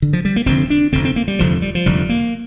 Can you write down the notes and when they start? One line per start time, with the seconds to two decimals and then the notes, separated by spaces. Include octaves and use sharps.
0.02 D3
0.13 F3
0.25 G3
0.36 A#3
0.46 F1 F2 D3 C4
0.70 D4
0.92 F1 F2 D3 C4
1.05 C4
1.16 A#3
1.28 G3
1.39 F1 F2 D3 F3
1.62 G3
1.75 F3
1.86 F1 F2 D3 G3
2.09 A#3